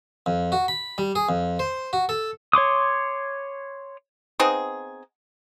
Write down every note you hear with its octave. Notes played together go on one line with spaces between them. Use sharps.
F2
F#4
B5
G3
G#4
F2
C5
F#4
A4
C#5 C6 D6 D#6
B3 C4 D#4 G#4